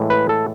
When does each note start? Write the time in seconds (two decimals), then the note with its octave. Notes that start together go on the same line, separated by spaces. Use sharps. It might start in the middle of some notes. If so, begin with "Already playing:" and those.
Already playing: A2 E3 G#3
0.10 B4
0.29 A4